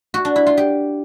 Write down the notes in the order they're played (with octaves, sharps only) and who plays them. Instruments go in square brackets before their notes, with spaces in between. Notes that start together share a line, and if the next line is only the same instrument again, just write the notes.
[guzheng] F#4
D4
E4
F4
G4